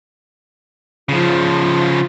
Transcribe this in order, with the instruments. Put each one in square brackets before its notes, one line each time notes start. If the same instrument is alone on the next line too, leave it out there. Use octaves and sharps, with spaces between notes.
[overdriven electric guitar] C#3 F3 [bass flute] F4